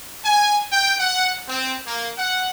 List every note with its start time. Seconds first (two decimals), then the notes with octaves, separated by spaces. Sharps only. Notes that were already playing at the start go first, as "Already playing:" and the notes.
0.24 G#5
0.71 G5
0.99 F#5
1.48 C4
1.86 A#3
2.17 F#5